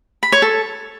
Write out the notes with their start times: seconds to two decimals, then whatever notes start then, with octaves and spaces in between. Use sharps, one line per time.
0.23 B5
0.32 C#5
0.42 A4